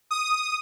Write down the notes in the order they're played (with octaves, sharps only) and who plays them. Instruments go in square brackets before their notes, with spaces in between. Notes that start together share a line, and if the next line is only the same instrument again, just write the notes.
[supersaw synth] D#6